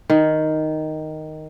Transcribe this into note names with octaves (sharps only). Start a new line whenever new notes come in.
D#3